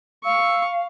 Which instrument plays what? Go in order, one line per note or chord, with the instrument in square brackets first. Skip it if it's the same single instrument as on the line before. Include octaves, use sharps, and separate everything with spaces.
[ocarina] F5 [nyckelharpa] C#6 [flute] E6